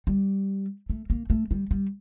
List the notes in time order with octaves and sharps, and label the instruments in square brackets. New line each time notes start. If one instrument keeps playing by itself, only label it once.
[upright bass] G3
A3
A#3
A3
G3
G3